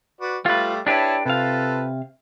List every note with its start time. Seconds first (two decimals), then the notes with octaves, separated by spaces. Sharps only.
0.21 F#4 B4 D5
0.46 G3 A3 F4 B4
0.87 D4 E4 G4 B4 C#5 A5
1.26 C3 F4 A4 B4 F5